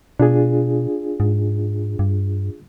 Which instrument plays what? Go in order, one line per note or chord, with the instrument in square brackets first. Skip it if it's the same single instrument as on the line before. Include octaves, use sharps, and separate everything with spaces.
[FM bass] B2 [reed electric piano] D4 F4 G#4
[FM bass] G#2
G2